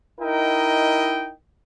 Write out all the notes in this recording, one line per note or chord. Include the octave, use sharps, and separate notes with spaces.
D#4 E4 A#4 D#5 G5